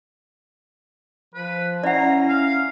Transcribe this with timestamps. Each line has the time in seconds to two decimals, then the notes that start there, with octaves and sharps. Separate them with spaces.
1.34 F3 B4
1.84 C#4 E4 D5 F#5 A#5
2.28 F5